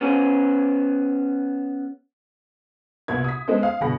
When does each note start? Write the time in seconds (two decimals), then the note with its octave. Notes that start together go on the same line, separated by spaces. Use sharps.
0.01 B3 C#4 G#4
3.08 C2 A#2 B3 F#4 G#6
3.24 D#6 B6
3.48 G#3 B3 C#4 A4 C5
3.63 F5
3.81 G1 B2 G#4 F#5 B5 A#6